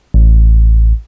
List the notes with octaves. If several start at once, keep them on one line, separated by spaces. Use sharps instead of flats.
A1